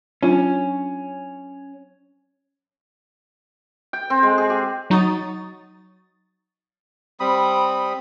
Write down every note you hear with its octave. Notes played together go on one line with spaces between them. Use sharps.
F#3 C#4 D4 F4
G5
C4
G#3
G#4
G4
F#3 D#4 C#6 D#6 A6
G3 C4 B5 D#6